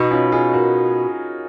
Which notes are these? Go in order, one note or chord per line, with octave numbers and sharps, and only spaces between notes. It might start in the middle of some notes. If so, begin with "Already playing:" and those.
Already playing: B2 D#4
C#4 F4
F4 G#4
F#4 A#4